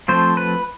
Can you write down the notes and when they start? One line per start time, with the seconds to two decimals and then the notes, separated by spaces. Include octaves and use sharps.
0.08 F3 A3 C4 C5
0.37 B4